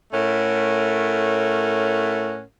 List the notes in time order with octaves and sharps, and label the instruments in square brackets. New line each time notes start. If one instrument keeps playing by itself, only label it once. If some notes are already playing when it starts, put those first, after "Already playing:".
[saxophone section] A2 A3 C#4 A#4 F#5